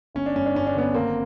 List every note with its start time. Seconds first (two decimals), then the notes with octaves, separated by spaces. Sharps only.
0.15 G1 C#4
0.26 D4
0.35 G2 C#4
0.46 D4
0.55 G2 C#4
0.67 D4
0.74 D3 B3 C#4
0.94 G#1 A#3 C4